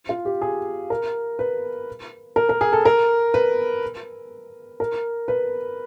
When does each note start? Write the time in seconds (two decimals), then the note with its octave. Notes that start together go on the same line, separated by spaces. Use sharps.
0.09 F4
0.25 G4
0.42 G#4
0.90 A#4
1.39 B4
2.36 A#4
2.49 A#4
2.61 G#4
2.73 A4
2.85 A#4
3.34 B4
4.80 A#4
5.28 B4